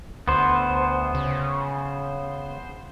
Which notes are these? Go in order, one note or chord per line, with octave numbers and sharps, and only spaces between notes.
D2 B3 C5
C#3